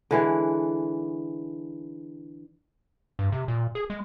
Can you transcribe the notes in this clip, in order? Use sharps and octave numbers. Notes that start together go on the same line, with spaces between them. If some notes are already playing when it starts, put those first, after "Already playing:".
D3 E3 G#3
G2
C3
A#2
G#4
G#3